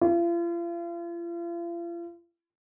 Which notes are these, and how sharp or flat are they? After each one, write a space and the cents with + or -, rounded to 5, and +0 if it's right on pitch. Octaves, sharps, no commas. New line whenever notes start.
F4 -40